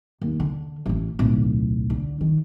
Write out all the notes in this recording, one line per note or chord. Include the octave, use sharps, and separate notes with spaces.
D#2
D3
A1 C#4
D1 B1
D3
D#3